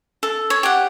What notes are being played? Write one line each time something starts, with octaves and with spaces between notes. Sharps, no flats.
A4
C#5
G4 F#5